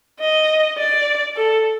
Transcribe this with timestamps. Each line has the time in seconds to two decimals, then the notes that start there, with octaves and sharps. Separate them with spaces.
0.20 D#5
0.78 D5
1.36 A4